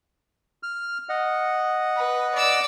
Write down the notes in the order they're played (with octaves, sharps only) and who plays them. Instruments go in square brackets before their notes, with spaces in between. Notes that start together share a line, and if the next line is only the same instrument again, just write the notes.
[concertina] F6
D#5 F#5
[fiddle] B4
D5 E6